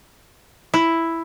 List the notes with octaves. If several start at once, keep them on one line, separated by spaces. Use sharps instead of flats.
E4